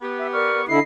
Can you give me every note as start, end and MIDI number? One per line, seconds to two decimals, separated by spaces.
0.02 0.68 59
0.02 0.68 67
0.19 0.27 76
0.33 0.61 70
0.33 0.61 74
0.33 0.66 85
0.33 0.61 89
0.68 0.79 50
0.68 0.79 64
0.68 0.83 75
0.68 0.82 96